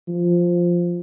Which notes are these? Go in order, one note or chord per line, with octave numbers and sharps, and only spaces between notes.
F3